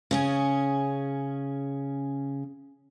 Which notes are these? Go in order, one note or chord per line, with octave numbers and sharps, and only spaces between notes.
C#3 C#4 G#4